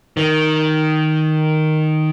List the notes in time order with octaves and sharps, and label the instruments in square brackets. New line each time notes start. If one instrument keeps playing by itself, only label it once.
[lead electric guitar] D#3